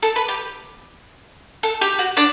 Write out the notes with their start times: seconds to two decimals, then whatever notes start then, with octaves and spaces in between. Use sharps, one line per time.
0.03 A4
0.16 B4
0.28 G4
1.63 A4
1.81 G4
1.99 F#4
2.17 D4